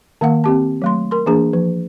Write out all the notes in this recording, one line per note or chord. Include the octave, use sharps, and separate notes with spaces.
D#3 A#3 F5 F#5
C4 G4 A5
F#3 A3 C6
A#4 C6
E3 A#3 D4 G#4 A#5
F3